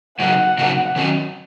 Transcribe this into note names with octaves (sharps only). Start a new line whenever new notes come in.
C#3 F#3 A#3 D#4 F#4 F#5
C#3 F#3 A#3 D#4 F#4
D#3 F#3 C#4 F#4